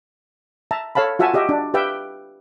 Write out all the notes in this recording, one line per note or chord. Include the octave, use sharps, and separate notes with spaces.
E5 A5 A#5
A4 C#5 F5 A5 B5
F4 F#4 E5 F#5 G#5 A5
F#4 G4 D#5 E5
D4
G4 B4 E5 F5 G5